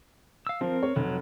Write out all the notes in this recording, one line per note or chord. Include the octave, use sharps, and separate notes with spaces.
F5 E6
F3 C4 A#4
C#5
F1 F#3